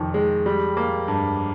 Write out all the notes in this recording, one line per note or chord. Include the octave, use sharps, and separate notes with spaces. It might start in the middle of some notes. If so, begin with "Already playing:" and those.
Already playing: F2 C3 D#3
G#3
G3
A#3
G2